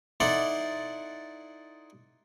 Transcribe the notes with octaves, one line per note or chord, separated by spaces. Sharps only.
D#4 E4 A4 C5 D5 F#5